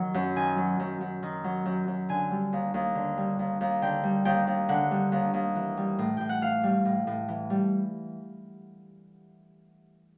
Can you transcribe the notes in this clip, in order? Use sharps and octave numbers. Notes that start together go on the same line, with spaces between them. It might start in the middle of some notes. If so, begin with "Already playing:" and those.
Already playing: D#3 F#3
F#2
D#3 G#5
F#3
F#2
F#2
D#3
F#3
F#2
F#2
D3 G#5
G3
D#2
D#2
D3
G3
D#2
D#2
D3 G5
G3
D#2 G5
D#2
D3 F#5
G3
D#2
D#2
E3
G3
A2
A2 G5
F#5
E3 F5
G3
A2
A2
E3
G3